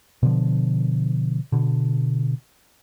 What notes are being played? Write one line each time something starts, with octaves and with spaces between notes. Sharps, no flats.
B2 D3 F3
B2 D3